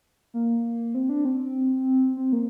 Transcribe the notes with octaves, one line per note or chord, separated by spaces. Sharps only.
A#3
C4
D4
C4
C4
A#3